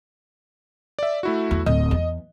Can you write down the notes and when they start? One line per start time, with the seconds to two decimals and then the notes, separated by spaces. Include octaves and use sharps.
0.99 D5 E5
1.23 A3 E4 F#4
1.51 E2
1.66 D1 D#5
1.91 E2